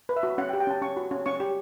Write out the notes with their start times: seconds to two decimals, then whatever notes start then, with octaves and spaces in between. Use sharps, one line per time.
0.09 B4
0.16 E5
0.23 F#4
0.38 C#4 F#5
0.49 G5
0.53 G4
0.60 G5
0.67 C#4 A5
0.82 C#4 C#6
0.97 F#4
1.11 C#4
1.26 C#4 C#6
1.40 G4